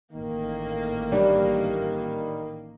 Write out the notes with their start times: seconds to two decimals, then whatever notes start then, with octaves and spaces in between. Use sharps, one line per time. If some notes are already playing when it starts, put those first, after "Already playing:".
0.12 A1 D#3 A#3
1.12 G3 D4